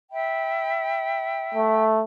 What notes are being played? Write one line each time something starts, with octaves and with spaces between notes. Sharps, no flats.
E5 G5 B5
A3